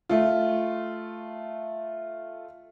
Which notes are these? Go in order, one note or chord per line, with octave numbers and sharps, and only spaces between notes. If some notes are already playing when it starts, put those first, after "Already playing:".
A3 F4